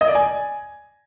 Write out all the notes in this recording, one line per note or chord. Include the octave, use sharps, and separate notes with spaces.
D#5
D5
G#5